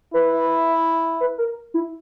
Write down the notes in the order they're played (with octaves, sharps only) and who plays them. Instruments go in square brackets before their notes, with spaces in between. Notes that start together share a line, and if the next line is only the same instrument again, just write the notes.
[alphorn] E4 [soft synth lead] B4
[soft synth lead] B4
A#4
E4